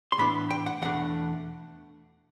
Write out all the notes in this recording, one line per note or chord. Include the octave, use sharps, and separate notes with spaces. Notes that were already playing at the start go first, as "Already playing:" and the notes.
C6
A2 E3 B3 D4 B5
G5
F#5
E2 B2 A3 D4 F#5